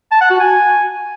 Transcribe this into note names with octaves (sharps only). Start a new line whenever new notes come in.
A5
F#5
F#4
G#5